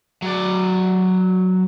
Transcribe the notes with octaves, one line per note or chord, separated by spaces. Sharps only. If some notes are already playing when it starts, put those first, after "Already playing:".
F#3 D5